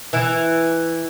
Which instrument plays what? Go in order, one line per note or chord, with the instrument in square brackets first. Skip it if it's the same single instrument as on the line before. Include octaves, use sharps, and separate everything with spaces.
[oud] E3